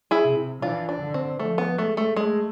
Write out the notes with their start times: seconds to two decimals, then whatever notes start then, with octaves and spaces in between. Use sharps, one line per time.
0.11 E4 G#4
0.24 C3
0.62 E3 D4 F4
0.89 D4
1.01 D3
1.14 C4
1.40 F3 A3
1.58 B3
1.78 G#3 A3
1.97 A3
2.17 G#3 A3